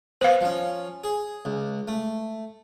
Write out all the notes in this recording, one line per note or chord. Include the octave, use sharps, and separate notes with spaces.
B3 C5 F5
F3 C#4
G#4
C#2
A3